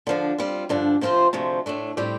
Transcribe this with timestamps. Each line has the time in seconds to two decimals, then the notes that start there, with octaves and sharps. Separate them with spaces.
0.07 D3 F3 D4
0.38 G3 C4 F4
0.69 G2 D3 F3 D4
1.01 C3 F3 C4 F4 C5
1.33 D2 C3 F3 A3
1.66 A2 A3 D4
1.97 A2 G3 C4 G4